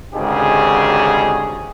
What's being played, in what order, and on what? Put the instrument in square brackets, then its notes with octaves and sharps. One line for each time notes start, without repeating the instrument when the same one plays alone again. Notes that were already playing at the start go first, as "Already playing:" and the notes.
[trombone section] G#1 D2 G#2 C#3 G4 G#4